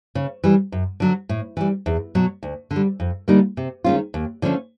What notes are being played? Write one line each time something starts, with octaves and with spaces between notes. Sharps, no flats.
C#3
E3 G3
F#2
D3 F#3
A2
E3 G3
E2
B2 F#3
D2
D3
G3
F2
D3 G3 A#3 D#4
C3
D#3 G#3 C#4 F4
D#2
D3 F3 A3 C#4